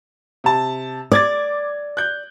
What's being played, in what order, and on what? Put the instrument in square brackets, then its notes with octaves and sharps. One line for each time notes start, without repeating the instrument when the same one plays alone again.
[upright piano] C3 A5
[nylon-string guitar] D5 [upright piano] D6 G#6 A6
[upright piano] F#6 G6